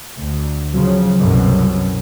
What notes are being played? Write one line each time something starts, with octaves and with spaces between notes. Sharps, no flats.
D2
C#3 F3 F#3
C2 F#2 B2